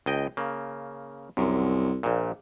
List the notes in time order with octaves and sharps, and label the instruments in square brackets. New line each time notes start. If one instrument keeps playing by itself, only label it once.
[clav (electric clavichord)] C#2 D#5 G5
C#3 A#3
[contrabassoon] C2 [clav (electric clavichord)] F#2
[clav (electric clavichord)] A#1 A#2